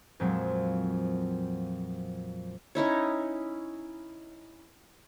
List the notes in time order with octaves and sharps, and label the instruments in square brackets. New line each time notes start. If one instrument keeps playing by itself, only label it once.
[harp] F2 A#2 F#3 G#3 C4
[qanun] C#4 D#4 E4 C#5